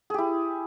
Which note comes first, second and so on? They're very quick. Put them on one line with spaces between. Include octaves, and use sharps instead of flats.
G#4 G4 E4